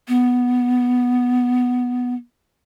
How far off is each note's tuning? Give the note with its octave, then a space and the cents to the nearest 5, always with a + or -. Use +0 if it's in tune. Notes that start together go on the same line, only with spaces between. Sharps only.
B3 +0